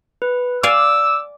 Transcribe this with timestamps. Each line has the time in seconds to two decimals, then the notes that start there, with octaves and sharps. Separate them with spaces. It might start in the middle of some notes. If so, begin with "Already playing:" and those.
0.22 B4
0.63 D5 F5 G#5 D6 E6